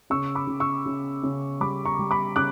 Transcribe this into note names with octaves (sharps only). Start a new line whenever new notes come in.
C#3 C#6 E6
B5 D6
C#3
C#6 E6
C#3
C#3
G3 B5 D6
A#5 C#6
G3
B5 D6
C#3 D6 F#6